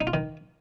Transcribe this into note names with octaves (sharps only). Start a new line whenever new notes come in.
D#4
F4
D#3